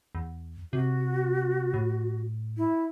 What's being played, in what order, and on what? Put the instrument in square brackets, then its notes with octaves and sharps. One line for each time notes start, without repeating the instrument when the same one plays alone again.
[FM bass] E2
[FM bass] C3 [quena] F#4
[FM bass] A2
[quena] E4